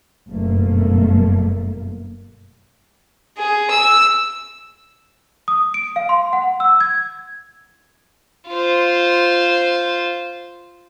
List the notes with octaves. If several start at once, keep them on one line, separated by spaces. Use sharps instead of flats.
F#1 G2 B2 A3 A#3
G#4
E6
D#6
D7
F5
C6
F#5
E6
G#6
F4 C5